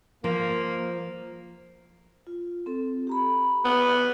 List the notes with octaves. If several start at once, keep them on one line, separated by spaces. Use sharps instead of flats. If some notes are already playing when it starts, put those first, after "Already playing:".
F3 A#3
F4
C4 A4
G4 A#5 B5
B3